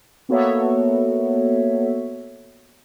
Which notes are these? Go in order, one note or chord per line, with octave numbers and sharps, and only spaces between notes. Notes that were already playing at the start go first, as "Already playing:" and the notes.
A#3 B3 F#4 A4 C#5 E5